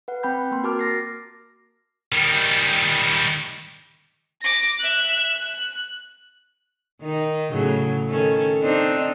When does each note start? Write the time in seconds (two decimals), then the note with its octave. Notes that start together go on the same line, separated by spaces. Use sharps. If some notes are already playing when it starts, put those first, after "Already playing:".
0.08 B4 F#5
0.23 C4 G5 B5 G6
0.51 A#3 C6
0.64 F#4 A#4 A5 D6 F6
0.79 F6 A6 A#6 C7
2.12 D#3 G3
4.41 D6 A#6
4.79 E5 F#6
5.34 F#6
7.02 D#3 D#4
7.51 A2 C#3 F#3
8.08 D#3 C#4 A4
8.62 C4 D4 D#4